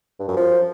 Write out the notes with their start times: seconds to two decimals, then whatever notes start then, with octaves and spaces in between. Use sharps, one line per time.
0.19 G2
0.28 F#2
0.36 F3